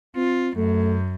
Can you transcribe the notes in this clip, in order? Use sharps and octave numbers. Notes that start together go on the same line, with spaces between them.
C4 F4
F#2 A3